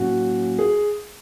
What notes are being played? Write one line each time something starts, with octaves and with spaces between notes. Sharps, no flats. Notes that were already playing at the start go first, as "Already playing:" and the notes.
Already playing: A2 F#3 A#3 C#4 F#4
G#4